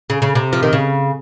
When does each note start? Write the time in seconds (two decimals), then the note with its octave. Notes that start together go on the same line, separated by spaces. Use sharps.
0.10 C#3
0.22 C#3
0.35 C3
0.53 F3
0.63 D#3
0.73 C#3